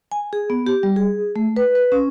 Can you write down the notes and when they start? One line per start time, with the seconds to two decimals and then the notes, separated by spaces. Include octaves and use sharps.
0.12 G#5
0.33 G#4
0.50 B3
0.67 G4
0.83 G3
0.96 G#4
1.36 A3
1.56 B4
1.75 B4
1.92 C#4